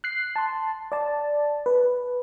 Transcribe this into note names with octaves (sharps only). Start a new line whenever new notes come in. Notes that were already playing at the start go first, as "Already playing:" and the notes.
F#6 C7
A5 C6
D5 A5
B4